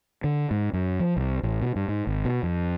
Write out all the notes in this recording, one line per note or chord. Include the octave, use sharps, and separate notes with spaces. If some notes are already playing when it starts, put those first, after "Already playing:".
D3
G#2
F#2
F3
C2
A1
B2
G2
G#2
G#1
B2
F2